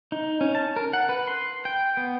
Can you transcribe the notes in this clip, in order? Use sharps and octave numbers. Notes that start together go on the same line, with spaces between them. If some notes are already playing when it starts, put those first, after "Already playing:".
D#4
C#4
A5
A#4
F#5
B4
C6
G5
B3